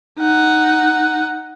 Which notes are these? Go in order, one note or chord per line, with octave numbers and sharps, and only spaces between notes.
D#4 F#5